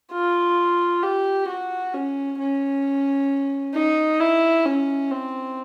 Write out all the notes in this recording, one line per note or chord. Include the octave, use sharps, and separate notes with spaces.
F4
G4
F#4
C#4
C#4
D#4
E4
C#4
C4